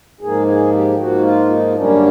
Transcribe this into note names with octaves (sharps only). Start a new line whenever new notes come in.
G#2 F3 A#3 G#4
G#4
G4
G#2 F3 A#3 F#4
F4
D#4
F#2 D3 G3 A#3 C#4 D4